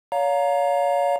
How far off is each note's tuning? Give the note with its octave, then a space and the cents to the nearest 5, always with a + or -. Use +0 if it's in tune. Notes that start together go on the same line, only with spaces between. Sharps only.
C#5 +35 F5 +20 A#5 +0